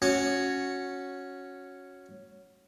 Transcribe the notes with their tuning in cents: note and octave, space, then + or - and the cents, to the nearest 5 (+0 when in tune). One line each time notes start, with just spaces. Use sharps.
C#4 +0 F#4 -10